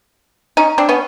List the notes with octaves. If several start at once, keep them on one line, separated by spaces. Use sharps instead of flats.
C#4 D#4
C4 D4
B3 C#4